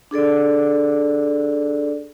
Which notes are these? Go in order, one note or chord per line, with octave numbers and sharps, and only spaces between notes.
D4 G#4 A4 D5